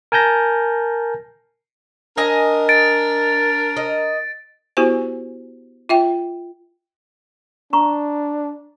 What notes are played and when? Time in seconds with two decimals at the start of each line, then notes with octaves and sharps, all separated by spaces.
0.12 A#4 G#5 A5 G6 A#6
2.18 D4 A#4 D#5 G#5
2.69 A6 D7
3.77 D#5
4.77 B3 E4 F#4 G4 C5 G#5
5.89 F4 E5 G5
7.73 D4 A#5 C#6